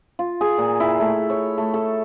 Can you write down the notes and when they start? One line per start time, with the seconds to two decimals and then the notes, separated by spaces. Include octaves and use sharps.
0.19 F4
0.41 G#4
0.58 A#2
0.80 E4
1.00 A3
1.30 C#5
1.58 A3
1.74 A4